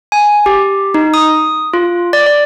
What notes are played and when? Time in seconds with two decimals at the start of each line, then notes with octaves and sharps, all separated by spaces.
0.12 G#5
0.46 G4
0.94 D#4
1.14 D#6
1.74 F4
2.13 D5
2.26 D5